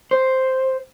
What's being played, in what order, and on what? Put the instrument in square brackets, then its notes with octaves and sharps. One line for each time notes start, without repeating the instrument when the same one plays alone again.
[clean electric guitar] C5